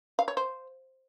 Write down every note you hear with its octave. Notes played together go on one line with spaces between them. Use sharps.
F5
C#5
C5